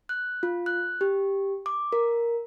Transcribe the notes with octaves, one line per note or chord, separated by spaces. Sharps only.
F#6
F4
F#6
G4
D6
A#4